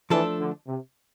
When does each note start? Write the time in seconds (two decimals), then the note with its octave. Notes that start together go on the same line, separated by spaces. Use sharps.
0.10 E3 F3 A3 D4 A4
0.39 D3
0.67 C3